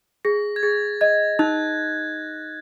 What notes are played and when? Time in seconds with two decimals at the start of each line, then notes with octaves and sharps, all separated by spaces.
0.25 G#4 A#6
0.56 G#6
0.63 G#4 A6
1.01 D#5 G#6
1.39 D#4 F#6